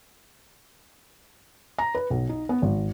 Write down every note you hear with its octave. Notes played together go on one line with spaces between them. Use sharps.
A#5
B4
B1
D#4
B3
G#1